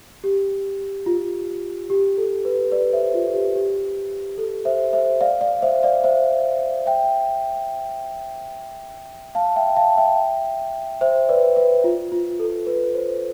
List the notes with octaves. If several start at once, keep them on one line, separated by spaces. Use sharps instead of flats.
G4
F4
G4
A4
B4
B4 D5
C5 E5
F4
G4
G4
A4
C5 E5
C5 E5
D5 F5
D5 F5
C5 E5
D5 F5
C5 E5
E5 G5
F5 A5
E5 G5
F5 A5
E5 G5
C5 E5
B4 D5
B4
F4
F4
A4
B4
C5